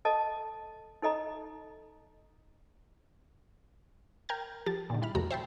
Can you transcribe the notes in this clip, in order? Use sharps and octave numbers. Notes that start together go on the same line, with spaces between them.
A4 D#5 A5
D#4 A4 D#5 A#5
A#4 G5 F6 G6 G#6
F3 G4 A5 A6
A#2 D3 D#3
G3 E4 B5 F6
C2 F2 C3 A3 F#4 A#5
C5 E5 G5 A5 B5 C6